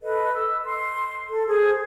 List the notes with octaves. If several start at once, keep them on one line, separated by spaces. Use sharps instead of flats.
A4 B4 D#5
E6
C6
A4
G#4 C5